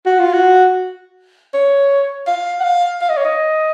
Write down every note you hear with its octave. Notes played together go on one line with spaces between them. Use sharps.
F#4
F4
F#4
C#5
F5
F#5
F5
F5
D#5
C#5
D#5